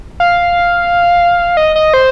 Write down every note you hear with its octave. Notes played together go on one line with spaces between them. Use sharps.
F5
D#5
D#5
C5